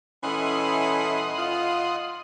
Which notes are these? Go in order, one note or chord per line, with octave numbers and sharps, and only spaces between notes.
E3 A3 C#4 D#5 F#5 C6
F4